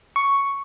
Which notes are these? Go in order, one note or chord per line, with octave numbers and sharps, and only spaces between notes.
C#6